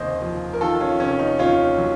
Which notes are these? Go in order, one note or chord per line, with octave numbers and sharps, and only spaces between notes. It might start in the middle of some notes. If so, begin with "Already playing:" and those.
Already playing: F1 D#2 C#3 C5 D#5
F3
A#4
D#3 F4 A4
C#4 F4
F1 C#4
D#4
D#2 C#4 F4
F#3